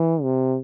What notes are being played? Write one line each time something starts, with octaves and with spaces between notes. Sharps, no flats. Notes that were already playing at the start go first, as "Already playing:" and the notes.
Already playing: E3
C3